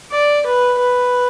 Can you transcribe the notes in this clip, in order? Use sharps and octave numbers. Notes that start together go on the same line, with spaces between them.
D5
B4
B4